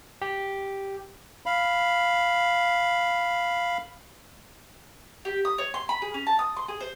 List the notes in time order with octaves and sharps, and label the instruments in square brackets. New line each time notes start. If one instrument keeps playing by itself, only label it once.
[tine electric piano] G4
[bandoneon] F5 B5
[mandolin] G4
D#6
C#5
C6
B5
G#4
C#4
A5
D#6
C6
G#4
C5